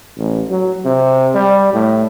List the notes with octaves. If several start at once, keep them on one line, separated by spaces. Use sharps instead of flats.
A1
F#3
C3
G3
A2